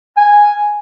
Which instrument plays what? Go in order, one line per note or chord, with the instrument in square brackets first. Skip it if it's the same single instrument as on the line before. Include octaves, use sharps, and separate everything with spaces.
[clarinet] G#5